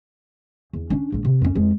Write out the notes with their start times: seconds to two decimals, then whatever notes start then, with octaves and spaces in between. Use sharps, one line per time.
0.73 E2
0.90 C#4 D4
1.12 A#1 G#2
1.25 C3
1.41 F2 C#4
1.55 F2 G#3